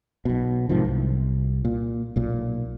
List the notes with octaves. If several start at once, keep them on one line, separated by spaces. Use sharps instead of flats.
B1 B2
G#2 C3 D#3 F3
C2
A#2
B1 A#2